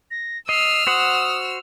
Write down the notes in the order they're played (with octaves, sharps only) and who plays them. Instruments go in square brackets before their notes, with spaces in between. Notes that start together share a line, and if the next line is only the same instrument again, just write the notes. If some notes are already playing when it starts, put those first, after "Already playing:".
[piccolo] A#6
[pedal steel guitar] D#5 [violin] E6 F6 [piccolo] C7
[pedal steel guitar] F#4 C5 F#5 [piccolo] D#6